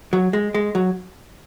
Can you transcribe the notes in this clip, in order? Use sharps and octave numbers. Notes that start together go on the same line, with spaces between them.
F#3
G#3
G#3
F#3